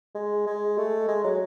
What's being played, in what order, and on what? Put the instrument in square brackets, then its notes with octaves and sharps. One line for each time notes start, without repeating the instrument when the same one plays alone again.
[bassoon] G#3
G#3
A3
G#3
F#3